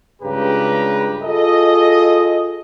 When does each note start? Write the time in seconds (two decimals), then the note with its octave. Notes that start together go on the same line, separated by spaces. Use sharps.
0.22 C#2 G2 C#3 G4 B4 A#5
1.22 F4 G#4 A4 D#5